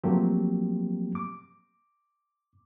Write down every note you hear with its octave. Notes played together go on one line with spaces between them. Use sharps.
F3 F#3 A3 A#3 C4 G4
D6